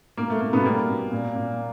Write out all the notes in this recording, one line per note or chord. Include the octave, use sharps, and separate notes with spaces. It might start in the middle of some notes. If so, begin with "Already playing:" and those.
B2 A#3
A3
B2 A#3
B2 B3
G3 A#3
B2
A#2
A#2